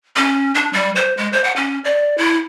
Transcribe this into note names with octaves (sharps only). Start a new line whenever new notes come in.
C#4
D4
G3
C5
G#3
C5
F#5
C#4
D5
E4